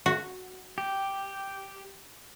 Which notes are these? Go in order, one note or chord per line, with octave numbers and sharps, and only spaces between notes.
F#4
G4